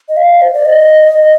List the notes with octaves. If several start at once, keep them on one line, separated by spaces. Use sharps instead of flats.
D#5
F5
C5
D5
D#5